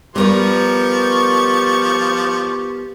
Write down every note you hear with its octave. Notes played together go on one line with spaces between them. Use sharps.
F3 G3 B3 G4 A#4 B4 C#6